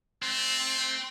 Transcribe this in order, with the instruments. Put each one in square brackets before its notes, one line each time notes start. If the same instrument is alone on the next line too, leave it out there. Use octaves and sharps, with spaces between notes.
[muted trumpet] A3 [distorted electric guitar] C4